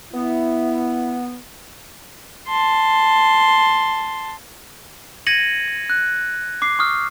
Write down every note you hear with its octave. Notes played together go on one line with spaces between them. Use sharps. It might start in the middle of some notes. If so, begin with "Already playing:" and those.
B3 E4
A5 C6
G#6 A#6 C#7 D#7 F#7
F#6
D6 C7
C#6 D#6 F6